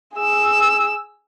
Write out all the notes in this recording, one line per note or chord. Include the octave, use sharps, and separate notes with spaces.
G#4 E6